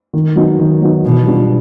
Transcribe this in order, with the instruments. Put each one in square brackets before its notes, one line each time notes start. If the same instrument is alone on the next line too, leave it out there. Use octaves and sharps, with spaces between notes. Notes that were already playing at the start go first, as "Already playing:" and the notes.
[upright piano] D#3
F#3 B3 D#4
D#3
F#3 B3 D#4
[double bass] B2 [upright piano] E3
[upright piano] G3 B3 D4 F4